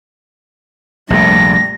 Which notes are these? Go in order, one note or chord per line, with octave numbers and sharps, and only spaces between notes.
A#1 F2 C3 G3 A3 A#6